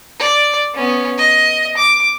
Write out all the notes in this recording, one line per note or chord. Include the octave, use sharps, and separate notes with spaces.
D5
B3 C#4
D#5
D6